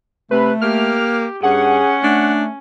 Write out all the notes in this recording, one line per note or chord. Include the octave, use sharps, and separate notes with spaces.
C3 A3 B4
A#3 G4 F6
G2 C#4 G#4 F#5
A3 D4